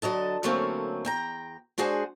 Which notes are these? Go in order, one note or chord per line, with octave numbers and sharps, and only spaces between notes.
D3 F#3 D#5 A5
D3 F#3 A3 A#3 C4 C#4
E2 G5 A#5
G#3 D4 F#4 G#4 C5